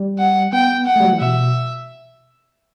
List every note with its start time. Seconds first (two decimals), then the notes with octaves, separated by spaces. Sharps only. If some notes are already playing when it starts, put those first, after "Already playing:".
Already playing: G3
0.18 F#5
0.53 B3 G5
0.86 F#5
0.96 A3
1.00 G3
1.04 F#3
1.13 E3
1.21 B2 E5